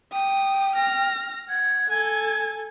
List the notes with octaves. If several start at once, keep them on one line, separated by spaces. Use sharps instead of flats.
G5 D#6
F6 A#6
F#5 G#6
A4 G#5